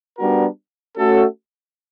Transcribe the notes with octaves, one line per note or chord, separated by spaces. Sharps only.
G3 B3 D4 F#4 A#4
A3 C#4 F#4 A4